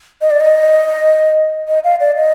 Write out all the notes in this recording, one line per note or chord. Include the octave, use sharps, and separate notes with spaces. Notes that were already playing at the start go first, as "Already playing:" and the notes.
D#5
D5
D#5
D#5
F5
D5
D#5